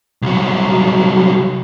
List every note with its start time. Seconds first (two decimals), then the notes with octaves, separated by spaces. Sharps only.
0.22 C2 F#3